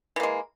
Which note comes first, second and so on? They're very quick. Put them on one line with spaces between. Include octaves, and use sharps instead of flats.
E3 A#3 G#3